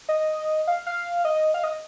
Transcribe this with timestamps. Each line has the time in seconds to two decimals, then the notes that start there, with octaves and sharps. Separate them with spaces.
0.09 D#5
0.67 F5
0.87 F5
1.25 D#5
1.54 F5
1.64 D#5